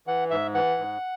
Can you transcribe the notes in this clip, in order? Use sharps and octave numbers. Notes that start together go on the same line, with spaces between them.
E3 F#5
G#2 E5
E3 F#5
G#2